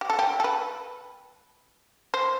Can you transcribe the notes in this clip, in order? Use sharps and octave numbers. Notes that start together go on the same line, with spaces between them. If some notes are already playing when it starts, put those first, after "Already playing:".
G4
A4
G4
A4
B4
C5